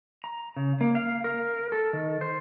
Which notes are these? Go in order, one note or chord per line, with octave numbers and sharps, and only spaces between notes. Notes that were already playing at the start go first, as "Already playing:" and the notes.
A#5
C#3
A#3
F5
A#4
A4
D#3
C5